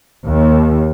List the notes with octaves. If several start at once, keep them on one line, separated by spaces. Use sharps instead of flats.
D#2